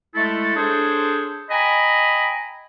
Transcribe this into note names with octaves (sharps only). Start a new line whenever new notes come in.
G#3 A3 E4 A4
D4 G#4 A4 C5 C#5
D#5 G5 G#5 A#5 B5